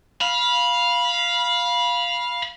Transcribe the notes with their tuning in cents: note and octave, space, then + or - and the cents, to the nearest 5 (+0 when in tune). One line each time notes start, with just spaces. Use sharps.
F5 +0 B5 -20